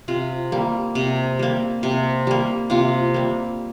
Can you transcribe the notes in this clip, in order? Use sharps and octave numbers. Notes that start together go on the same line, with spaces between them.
C3 F4
G3 A#3
C3
G3 A#3
C3
G3 A#3
C3 F4
G3 A#3